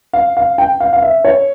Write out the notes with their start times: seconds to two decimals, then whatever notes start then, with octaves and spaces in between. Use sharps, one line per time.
0.13 F5
0.37 F5
0.58 G5
0.80 F5
0.93 F5
1.02 E5
1.25 C#5